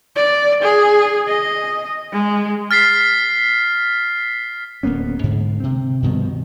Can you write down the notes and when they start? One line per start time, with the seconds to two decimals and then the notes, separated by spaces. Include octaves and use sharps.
0.16 D5
0.63 G#4
1.28 D#5
2.12 G#3
2.71 F6 A6 B6 C7
4.83 D1 A#3 B3 C#4
5.23 G#2 D3
5.60 C3 C4
6.02 G2 B2 D#3 F3